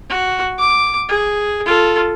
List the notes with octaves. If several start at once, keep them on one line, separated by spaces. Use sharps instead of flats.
F#4
D6
G#4
F4 A4